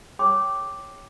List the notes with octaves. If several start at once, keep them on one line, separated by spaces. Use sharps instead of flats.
G#4 C#5 G5 C6 D6